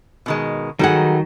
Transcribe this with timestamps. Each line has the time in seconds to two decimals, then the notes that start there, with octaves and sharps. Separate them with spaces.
0.26 B2 D#3 G#3
0.79 D#3 F#3 G3 D#4 F#4 G#4 A4 F#5